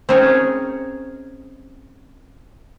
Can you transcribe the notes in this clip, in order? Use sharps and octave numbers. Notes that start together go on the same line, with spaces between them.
C4 C#4 D#4 G#4 A#4 C#5